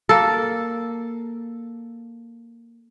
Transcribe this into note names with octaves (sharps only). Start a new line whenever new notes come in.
A#3 A4